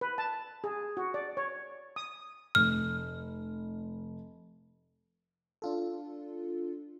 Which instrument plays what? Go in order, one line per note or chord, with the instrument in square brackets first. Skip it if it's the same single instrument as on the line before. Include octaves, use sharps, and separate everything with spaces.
[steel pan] B4
A5
G#4
F#4
D5
C#5
D#6
[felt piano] F1 [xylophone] F6
[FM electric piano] D4 F4 A4